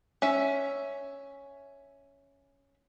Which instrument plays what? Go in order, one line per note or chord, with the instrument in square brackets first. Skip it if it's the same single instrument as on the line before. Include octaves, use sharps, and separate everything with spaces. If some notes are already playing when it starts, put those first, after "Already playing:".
[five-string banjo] C#4 E5